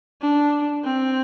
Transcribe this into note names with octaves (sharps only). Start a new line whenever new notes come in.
D4
C4